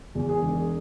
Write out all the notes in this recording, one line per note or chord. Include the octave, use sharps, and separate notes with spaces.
E2
G#4
E1